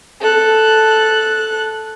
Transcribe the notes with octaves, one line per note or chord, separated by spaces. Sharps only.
A4 F#6